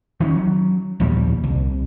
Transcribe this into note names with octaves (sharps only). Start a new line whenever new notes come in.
D#3 C4 C#4
F#3
A#1 D#2 B2 G3
C2